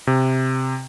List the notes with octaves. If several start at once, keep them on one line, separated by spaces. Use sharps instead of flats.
C3